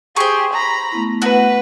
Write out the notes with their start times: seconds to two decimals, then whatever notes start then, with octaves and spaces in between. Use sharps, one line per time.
0.16 G4 G#4 C5 C#6
0.53 A#5 B5
0.92 A3 B3 E4
1.22 F#4 B4 F#5